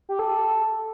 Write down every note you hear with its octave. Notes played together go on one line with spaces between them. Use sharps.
G4
A4
A4